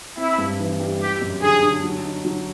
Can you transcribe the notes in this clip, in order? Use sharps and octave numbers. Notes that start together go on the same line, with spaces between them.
C4 E4
G2
E3
G3
G3 G4
F#2
D3 G#4
D3
F#3
D#4
F#3